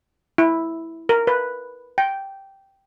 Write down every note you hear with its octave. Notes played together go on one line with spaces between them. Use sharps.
E4
A#4
B4
G5